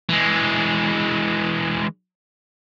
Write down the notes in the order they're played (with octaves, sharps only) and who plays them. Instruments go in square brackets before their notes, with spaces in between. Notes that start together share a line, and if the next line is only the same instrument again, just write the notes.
[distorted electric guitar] E3 G#3